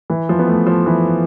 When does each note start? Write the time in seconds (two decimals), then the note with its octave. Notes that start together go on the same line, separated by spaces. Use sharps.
0.10 E3
0.29 F3
0.39 B3
0.47 A3
0.67 F3
0.86 E3